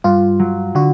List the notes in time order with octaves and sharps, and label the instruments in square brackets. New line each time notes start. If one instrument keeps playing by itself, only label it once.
[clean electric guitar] G2 [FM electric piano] F4
[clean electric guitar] F#3
[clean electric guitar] D3 [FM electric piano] F#4